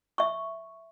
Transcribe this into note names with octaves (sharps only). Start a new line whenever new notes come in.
E5 C#6